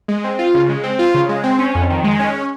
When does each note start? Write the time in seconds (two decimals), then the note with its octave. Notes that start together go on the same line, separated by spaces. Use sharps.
0.08 G#3
0.24 C4
0.39 F4
0.54 C#3
0.69 G#3
0.83 C4
0.99 F4
1.14 C#3
1.29 G#3
1.44 C4
1.59 C#4
1.75 F2
1.90 D#3
2.04 G#3
2.19 C#4